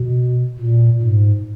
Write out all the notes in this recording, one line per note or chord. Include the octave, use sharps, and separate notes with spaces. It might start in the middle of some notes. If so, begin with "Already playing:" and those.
Already playing: B2
A#2
G#2